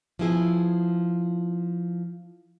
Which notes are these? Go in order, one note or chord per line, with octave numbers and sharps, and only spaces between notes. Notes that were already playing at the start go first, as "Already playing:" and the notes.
F3 B3 E4 G#4